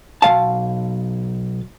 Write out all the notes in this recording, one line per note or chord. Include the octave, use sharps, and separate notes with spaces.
B1 D#3 F5 A5